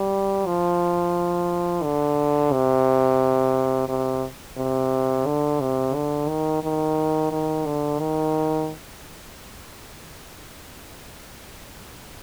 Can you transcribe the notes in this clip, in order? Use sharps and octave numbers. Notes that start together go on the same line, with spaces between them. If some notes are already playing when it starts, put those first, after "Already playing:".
Already playing: G3
F3
D3
C3
C3
C3
D3
C3
D3
D#3
D#3
D#3
D3
D#3